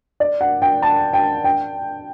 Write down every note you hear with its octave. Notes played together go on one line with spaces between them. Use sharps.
D5
F#5
G5
A5
G5
G5